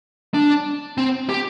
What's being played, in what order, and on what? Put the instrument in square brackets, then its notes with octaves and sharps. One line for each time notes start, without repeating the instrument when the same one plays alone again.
[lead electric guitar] D4
C4
G4